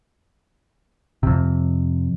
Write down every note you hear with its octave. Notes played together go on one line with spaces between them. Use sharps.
F2 C3